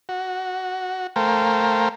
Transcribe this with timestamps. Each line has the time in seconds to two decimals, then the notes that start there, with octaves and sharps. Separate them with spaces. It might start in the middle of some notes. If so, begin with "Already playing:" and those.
0.09 F#4
1.16 A3 A#4 C5 F5 G5